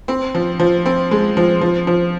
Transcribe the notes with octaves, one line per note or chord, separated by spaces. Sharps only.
C4
F3
F3
C4
G#3
F3
F3
F3